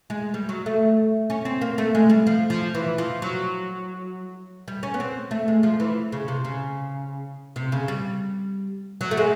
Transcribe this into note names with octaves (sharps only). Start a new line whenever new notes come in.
G#3
G3
F#3
A3
C#4
C4
A#3
A3
G#3
G3
F3
F3
E3
F3
F#3
G3
C#4
B3
C4
A3
G#3
F3
E3
C#3
C3
C#3
C3
C#3
G3
F#3
A3
G#3